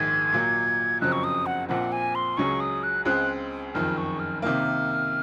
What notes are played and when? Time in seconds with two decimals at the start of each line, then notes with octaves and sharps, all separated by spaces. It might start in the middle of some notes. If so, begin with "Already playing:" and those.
Already playing: A#1 G#2 D#3 G#3 G#6
0.33 A#2 F#3 A#3
1.01 F#1 F2 C#3 F#3 C4 F#6
1.12 C#6
1.24 D#6
1.46 F#5
1.69 A#1 A#2 F3 C4 F#5
1.92 G#5
2.15 C6
2.37 C#2 C#3 F#3 C#4 G#4 C#6
2.60 D#6
2.83 F#6
3.05 C#2 C#3 G#3 C4 F#6
3.74 F#1 F2 D#3 F6
3.97 C#6
4.20 F6
4.42 C3 D#3 A#3 F6